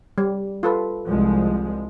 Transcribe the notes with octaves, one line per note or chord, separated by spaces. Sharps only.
G3
F4 A4 B4
C2 F3 G#3